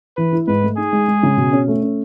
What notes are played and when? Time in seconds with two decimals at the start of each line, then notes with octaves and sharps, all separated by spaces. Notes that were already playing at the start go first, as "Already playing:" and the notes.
0.17 E3 B4
0.32 E4
0.48 G#2 B4
0.63 A3
0.77 D#4 G#4
0.93 G#3
1.08 G#3
1.23 C#3
1.37 B2
1.53 C#4
1.68 A3
1.83 C#4